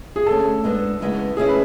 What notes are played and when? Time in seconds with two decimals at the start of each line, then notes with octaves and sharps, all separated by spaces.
0.16 G#4
0.26 D3 A3 C#4 A4
0.64 G#2 G#3 B3 D4
1.00 E2 C#3 G#3 B3 E4
1.37 B2 A3 C#4 E4 G#4
1.49 B4